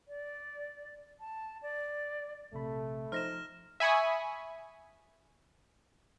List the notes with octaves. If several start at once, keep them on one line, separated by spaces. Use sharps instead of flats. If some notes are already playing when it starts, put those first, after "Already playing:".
D5
A5
D5
A#1 C3 A3 B5
F3 D#4 C5 A#5 F6 A#6 E7
E5 G#5 B5 C#6 D#6